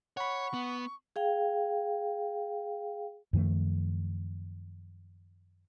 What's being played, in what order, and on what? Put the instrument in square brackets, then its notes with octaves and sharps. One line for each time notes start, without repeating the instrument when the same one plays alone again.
[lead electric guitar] C#5 [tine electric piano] F#5 B5 [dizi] C#6
[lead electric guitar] B3
[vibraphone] G#4 F5 G5
[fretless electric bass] F#2 D#3 F3 A3